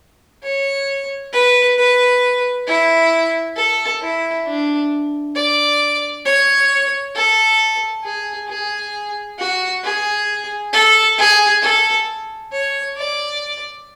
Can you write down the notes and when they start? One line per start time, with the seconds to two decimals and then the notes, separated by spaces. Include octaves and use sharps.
0.44 C#5
1.33 B4
1.78 B4
2.67 E4
3.56 A4
4.02 E4
4.46 D4
5.36 D5
6.25 C#5
7.15 A4
8.04 G#4
8.49 G#4
9.38 F#4
9.84 G#4
10.73 A4
11.18 G#4
11.62 A4
12.52 C#5
12.97 D5